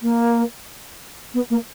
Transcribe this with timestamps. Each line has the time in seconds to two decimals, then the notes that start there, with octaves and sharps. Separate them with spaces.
0.02 A#3
1.34 B3
1.50 A#3